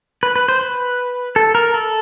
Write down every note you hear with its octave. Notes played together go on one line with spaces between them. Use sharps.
B4
B4
C5
B4
A4
A#4
A4